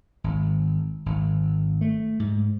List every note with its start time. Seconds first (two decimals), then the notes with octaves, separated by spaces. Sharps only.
0.24 G#1
1.06 G#1
1.81 A3
2.20 G#2